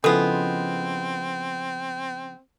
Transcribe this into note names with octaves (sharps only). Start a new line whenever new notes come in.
C#3 F3 G#3 B3 C4 E4 A4